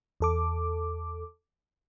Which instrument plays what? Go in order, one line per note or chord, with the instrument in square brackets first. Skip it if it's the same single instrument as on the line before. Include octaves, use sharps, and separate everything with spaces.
[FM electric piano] E2 A4 D6